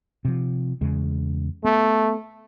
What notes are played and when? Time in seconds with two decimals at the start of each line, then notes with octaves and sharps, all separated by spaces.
0.25 C3 F3
0.81 E2 C#3 G#3
1.64 A3 B3